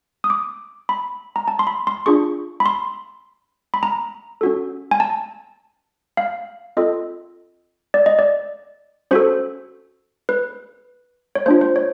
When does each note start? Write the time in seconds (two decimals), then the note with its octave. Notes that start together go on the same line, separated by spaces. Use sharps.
0.24 D#6
0.30 D6
0.89 B5
1.36 A#5
1.48 A5
1.59 C6
1.67 B5
1.87 C6
2.06 D4 F4 G#4 C#6
2.60 B5
2.66 C6
3.74 B5
3.83 A#5
4.41 C#4 F#4 A4
4.91 G#5
5.00 A5
6.17 F5
6.77 C4 F4 A4 D#5
7.94 D5
8.06 D#5
8.19 D5
9.11 C#4 F#4 A4 C5
10.29 B4
11.35 C#5
11.46 A#3 D4 F4 C5
11.61 C5
11.76 C#5